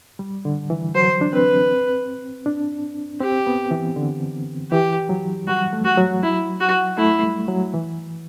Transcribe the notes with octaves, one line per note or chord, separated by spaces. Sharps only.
G3
D3
E3
F#3 C5
D4
C4 B4
D4
C4 G4
B3
E3
D3
E3 G4
F#3
G3 F#4
A3
F#4
F#3
E4
F#4
A3 E4
G3
F#3
E3